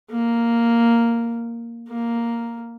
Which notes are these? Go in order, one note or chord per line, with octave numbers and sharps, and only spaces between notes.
A#3
A#3